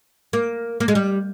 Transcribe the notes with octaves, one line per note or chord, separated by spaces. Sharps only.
A#3
A#3
G#3
G3